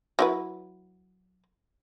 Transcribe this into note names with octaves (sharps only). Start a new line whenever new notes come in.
F#3 E4 B4